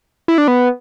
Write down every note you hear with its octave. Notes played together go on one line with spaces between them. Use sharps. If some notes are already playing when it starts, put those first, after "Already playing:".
E4
D4
B3